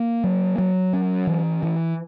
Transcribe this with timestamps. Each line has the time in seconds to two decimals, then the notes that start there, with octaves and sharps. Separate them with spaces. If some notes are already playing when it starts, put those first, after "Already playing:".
Already playing: A#3
0.24 F#3
0.58 F#3
0.93 C#4
1.27 E3
1.62 E3